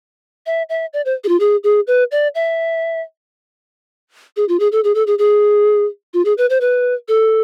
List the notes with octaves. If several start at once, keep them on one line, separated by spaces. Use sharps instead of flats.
E5
E5
D5
C5
G#4
F4
G#4
G#4
B4
D5
E5
G#4
F4
G#4
A4
G#4
A4
G#4
G#4
F4
G#4
B4
C5
B4
A4